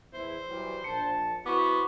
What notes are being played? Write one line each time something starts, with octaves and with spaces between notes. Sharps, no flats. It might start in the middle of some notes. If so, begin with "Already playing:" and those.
E2 E4 C5
E3 F#3 G3
A#1 A5 C#7
B3 E4 F#4 C5 C#6 D6